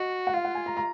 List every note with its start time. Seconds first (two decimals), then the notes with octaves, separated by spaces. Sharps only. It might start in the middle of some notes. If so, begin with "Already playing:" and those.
Already playing: F#4 D#5
0.27 F#5
0.34 F4 F5
0.45 F#5
0.55 G#5
0.66 A#5
0.77 A#5